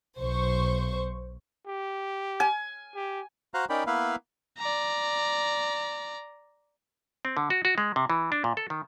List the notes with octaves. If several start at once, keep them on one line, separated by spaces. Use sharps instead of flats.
B1 C5 C#6
G4
G#5
G4
F#4 C5 F5 A#5 F#6
C#4 D#4 A#4 D5 G5 B5
A#3 B3 E4 B4 E5 F5
D5 A#5
C4
D3
F#4
F#4
G#3
C3
E3
D4
A#2
A4
D#3